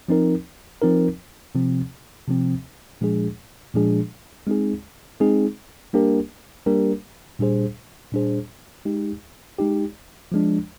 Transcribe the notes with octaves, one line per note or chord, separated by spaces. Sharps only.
F3 C4 D#4 A#4
F3 C4 D#4 A#4
C3 F3 C4
C3 F3 C4
A#2 F3 G#3 D4 G#4
A#2 F3 G#3 D4 G#4
G#3 C4 D#4 G#4
G#3 C4 D#4 G#4
G3 A#3 D4 G4 A#4
G3 A#3 D4 G4 A#4
A#2 G3 D4 G#4 C5
A#2 G3 D4 G#4 C5
G#3 D#4 G4
G#3 D#4 G4
F3 G#3 D4